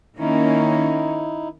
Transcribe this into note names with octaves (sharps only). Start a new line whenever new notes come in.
D#3 A#3 C#4 D#4 E4